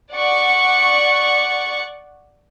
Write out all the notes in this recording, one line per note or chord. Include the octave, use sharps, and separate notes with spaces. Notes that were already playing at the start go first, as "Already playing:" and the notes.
D5 F#5 C#6